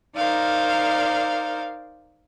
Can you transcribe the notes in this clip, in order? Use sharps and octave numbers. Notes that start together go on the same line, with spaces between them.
D#4 A#4 C5 D5 F5